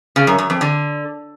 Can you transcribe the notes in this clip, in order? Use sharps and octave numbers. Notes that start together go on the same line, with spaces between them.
C#3
F#2
F#2
F2
D3